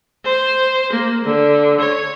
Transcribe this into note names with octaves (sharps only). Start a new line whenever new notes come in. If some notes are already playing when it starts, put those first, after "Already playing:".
C5
A#3
D3
C#5